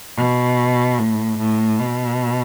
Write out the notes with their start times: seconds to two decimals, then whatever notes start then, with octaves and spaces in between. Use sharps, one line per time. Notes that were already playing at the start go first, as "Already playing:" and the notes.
0.17 B2
0.99 A2
1.39 A2
1.80 B2